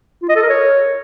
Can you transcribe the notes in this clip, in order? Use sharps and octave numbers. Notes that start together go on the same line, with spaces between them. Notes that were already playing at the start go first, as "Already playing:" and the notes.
F4
D#5
A4
A#4
C#5